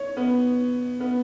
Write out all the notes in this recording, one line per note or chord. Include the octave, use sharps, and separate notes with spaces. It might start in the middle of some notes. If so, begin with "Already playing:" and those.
Already playing: C#5
B3
B3